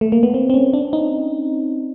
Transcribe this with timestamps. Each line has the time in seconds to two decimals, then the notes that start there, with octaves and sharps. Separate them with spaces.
0.01 A3
0.12 A#3
0.23 B3
0.34 C4
0.50 C4
0.54 C#4
0.73 D4
0.93 D#4